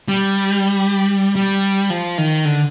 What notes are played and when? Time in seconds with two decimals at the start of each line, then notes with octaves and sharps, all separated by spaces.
0.08 G3
1.36 G3
1.90 F3
2.18 D#3
2.45 D3